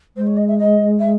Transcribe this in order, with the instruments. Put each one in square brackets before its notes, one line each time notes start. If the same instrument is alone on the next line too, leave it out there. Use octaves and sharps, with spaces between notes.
[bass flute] G#3 [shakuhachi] C5
[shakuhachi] C#5
D#5
E5
D#5
E5